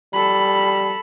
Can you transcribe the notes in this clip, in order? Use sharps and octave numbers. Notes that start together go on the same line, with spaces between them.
G3 A4 B5